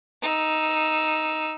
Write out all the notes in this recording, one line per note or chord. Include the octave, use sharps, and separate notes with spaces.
D#4 E6